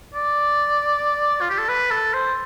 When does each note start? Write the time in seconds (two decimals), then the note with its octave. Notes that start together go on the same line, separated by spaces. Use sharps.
0.14 D5
1.41 F4
1.50 G4
1.59 A4
1.69 B4
1.91 A4
2.14 C5